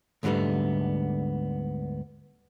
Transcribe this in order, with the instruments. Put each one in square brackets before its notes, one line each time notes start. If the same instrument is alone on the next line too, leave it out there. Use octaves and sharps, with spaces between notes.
[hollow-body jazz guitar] D2 G#2 D3 G3 A3 B3